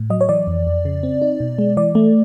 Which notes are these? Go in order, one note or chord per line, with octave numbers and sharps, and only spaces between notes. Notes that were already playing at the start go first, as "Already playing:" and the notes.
Already playing: A2
F#3 D#5
C#5
E3 D5
F2
F2
C#3
C4
D#4
B2
G#3
E3 D5
A3